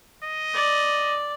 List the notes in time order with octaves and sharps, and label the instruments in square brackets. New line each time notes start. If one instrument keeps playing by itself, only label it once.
[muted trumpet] D#5
[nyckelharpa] D5